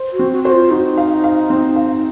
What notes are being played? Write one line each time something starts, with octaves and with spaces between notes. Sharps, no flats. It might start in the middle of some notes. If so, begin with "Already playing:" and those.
Already playing: C5
F#4
C4
F#4
F#4 C5
F4
D#4 F#4
F5
F5
C4
F5